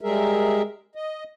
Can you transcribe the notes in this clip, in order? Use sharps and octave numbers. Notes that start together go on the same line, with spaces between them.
G3 G#3 G#4 A#4 E5
D#5